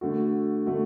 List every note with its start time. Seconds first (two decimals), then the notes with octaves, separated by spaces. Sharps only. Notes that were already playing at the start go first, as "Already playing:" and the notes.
0.01 D3 A3 F#4
0.66 D3 A3 F#4